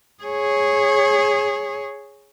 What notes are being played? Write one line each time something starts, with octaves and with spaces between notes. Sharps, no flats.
G#4 C#5